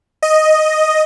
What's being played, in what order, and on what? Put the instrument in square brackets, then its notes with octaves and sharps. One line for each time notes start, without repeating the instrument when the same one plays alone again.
[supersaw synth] D#5